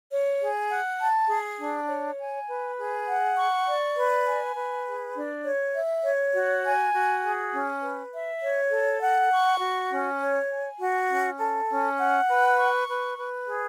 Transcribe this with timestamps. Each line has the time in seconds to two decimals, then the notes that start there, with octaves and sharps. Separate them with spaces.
0.11 C#5
0.41 G#4
0.69 F#5
1.00 A5
1.29 G#4
1.59 D4
1.88 C#5
2.19 G#5
2.48 B4
2.78 G#4
3.07 F#5
3.37 C#6
3.67 D5
3.96 B4
4.26 G#5
4.56 B4
4.86 G#4
5.15 D4
5.45 C#5
5.75 E5
6.05 C#5
6.34 F#4
6.64 G#5
6.93 F#4
7.23 G#4
7.53 C#4
7.83 B4
8.13 E5
8.42 C#5
8.71 A4
9.02 F#5
9.31 C#6
9.60 F#4
9.90 C#4
10.20 C#5
10.50 G#5
10.80 F#4
11.09 C#4
11.39 A4
11.68 C#4
11.98 F#5
12.28 B4
12.57 C#6
12.87 B4
13.17 B4
13.47 G#4